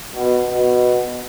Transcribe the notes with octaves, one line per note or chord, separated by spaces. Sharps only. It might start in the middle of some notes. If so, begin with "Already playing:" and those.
B2
B2